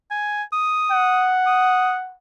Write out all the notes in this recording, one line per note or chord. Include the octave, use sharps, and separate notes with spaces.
G#5
D#6
F#5
D#6